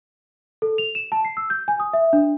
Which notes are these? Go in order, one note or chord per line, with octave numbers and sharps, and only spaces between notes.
A4
F7
E7
A5
C7
E6
G6
G#5
D#6
E5
D4